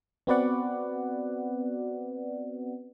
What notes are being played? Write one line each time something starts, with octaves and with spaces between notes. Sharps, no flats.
B3 C4 F#4 B4 D5 F#5